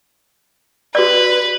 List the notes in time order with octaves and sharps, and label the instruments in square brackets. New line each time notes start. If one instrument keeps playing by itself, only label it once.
[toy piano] F#4 D5 [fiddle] B4